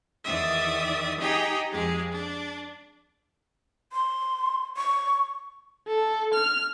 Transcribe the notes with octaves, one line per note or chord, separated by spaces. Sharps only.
E2 D#3 D5 E5 D#6
D#4 G4 G#4 G5 G#5 A#5
F2 G#3 G4 G#4
D4
C6
C#6
A4
F6